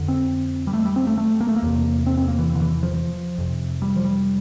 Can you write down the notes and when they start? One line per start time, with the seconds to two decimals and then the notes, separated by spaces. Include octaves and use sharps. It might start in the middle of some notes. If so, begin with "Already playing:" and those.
Already playing: F2 D3
0.08 C4
0.67 G3
0.73 A3
0.85 G3
0.96 C4
1.07 A3
1.18 A3
1.40 A#3
1.48 A3
1.56 A#3
1.63 E2 C3
2.06 C4
2.17 C4
2.28 A#3
2.39 E3
2.55 D3
2.62 E3
2.83 F3
2.95 F3
3.38 F2 C3
3.82 G3
3.96 F3
4.05 G3